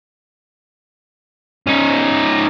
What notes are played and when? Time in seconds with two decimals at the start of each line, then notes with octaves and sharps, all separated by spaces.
1.67 C#4 D#4